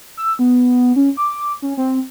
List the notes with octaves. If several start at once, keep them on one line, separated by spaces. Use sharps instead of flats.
E6
B3
C#4
D6
C#4
C4